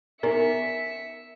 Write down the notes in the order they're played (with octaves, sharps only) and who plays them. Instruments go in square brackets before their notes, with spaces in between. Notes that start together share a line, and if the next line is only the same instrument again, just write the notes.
[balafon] B3 D#4 [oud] A#4 D5 [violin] E5 C#7